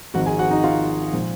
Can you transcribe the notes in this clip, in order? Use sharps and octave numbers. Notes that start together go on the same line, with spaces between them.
G#1 G#2 F3 F#4 F#5
G#4 G#5
F#4 F#5
D#4 D#5
F4 F5
A#2 F3